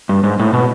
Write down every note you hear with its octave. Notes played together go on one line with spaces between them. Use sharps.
G2
G#2
A2
B2